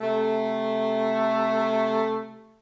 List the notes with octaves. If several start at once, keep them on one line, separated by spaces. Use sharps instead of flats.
C3 A3